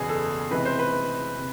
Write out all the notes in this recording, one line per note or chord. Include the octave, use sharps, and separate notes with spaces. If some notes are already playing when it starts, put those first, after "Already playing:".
Already playing: F#1 E2 B2 G#4
A4
C#2 C3 E3 B4
C5
B4
C3